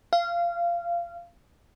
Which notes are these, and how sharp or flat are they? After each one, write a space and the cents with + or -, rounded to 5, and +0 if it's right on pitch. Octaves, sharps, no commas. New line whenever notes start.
F5 -20